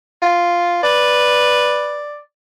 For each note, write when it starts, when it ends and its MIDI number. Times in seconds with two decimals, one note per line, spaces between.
0.22 0.80 65
0.83 2.05 71
0.83 2.19 74